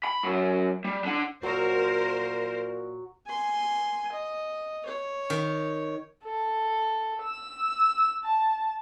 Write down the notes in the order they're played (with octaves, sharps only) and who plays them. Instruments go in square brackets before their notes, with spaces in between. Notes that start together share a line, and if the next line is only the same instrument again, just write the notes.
[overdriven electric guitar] B5
F#2
G3
D4 F#5
[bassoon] A#2 [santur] F#3 F#4 [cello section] A#4 C5
[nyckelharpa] G#5 C6
D#5
C#5
[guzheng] D#3
[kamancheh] A4
E6
A5